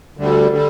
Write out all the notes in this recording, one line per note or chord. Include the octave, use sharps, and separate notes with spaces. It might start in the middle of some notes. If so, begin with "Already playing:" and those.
D2 D3 G3
D3 G3